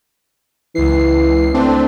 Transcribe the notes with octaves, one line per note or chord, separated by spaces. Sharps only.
C#2 E3 C7
A3 C4 D4